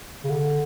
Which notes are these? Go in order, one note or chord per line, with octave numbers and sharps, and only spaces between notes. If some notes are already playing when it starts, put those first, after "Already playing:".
C#3
D3